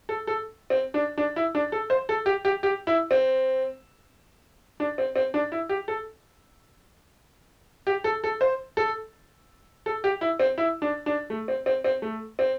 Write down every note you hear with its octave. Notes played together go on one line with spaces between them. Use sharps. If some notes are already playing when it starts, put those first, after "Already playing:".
A4
A4
C4
D4
D4
E4
D4
A4
C5
A4
G4
G4
G4
E4
C4
D4
C4
C4
D4
E4
G4
A4
G4
A4
A4
C5
A4
A4
G4
E4
C4
E4
D4
D4
A3
C4
C4
C4
A3
C4